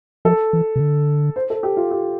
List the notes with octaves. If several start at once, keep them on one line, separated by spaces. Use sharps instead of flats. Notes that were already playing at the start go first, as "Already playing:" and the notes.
F3 A4
E3
C3
D3
C5
A4
G4
F4
G4